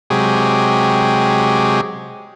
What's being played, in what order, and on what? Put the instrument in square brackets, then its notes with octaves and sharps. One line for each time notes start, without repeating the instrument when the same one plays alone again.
[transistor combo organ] C3 F#3 G#3 G4 G#4